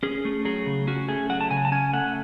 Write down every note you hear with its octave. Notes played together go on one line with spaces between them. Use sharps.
C#4 G#4
A3
F#3 G#4
C#3
C#4 F#4
A3 G#4
F#3 F#5
A5
C#3 G#5
A5
C#4 G#5
A3 F#5